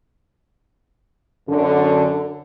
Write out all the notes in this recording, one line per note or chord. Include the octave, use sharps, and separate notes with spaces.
F#2 D3